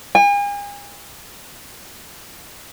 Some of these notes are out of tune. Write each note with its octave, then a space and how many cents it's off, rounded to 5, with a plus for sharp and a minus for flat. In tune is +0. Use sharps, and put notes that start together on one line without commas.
G#5 -40